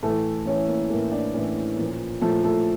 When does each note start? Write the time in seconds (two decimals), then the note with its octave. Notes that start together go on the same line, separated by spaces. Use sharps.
0.03 A2 E3 A3 A4
0.46 A2 E3 C#4 C#5
0.68 A#3 A#4
0.90 A2 E3 A#3 A#4
1.12 D4 D5
1.34 A2 E3 C#4 C#5
1.77 A#2 F3
2.21 A#2 F3 A3 A4
2.44 A3 A4